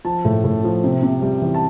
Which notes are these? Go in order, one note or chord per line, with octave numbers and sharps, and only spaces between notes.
F3 A5
A2
A2
F3
C3
C3
G3
E3
A5